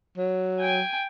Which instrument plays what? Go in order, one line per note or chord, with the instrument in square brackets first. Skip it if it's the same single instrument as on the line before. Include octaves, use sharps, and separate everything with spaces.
[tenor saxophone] F#3
[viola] G5 G#5